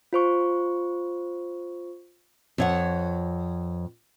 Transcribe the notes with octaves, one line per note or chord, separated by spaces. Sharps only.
F4 C5 C#6
F2 C#5 F#5